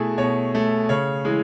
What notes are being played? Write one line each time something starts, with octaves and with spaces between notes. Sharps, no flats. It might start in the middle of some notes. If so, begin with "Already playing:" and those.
Already playing: B2 A3 E4 G#4
B2 C#5
A3
C#3 C#5
E3 G#3